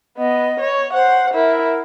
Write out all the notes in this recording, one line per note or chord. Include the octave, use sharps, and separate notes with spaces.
B3 D#5
C#5
C5 F#5
E4 A#4